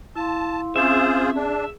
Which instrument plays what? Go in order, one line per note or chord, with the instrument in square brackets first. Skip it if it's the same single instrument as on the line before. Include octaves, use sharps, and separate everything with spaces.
[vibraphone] E4 F5 C6 [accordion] A5
[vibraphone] C4 C#4 [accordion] F4 G#4 C5 [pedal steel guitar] E5
[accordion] D4 [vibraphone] G#4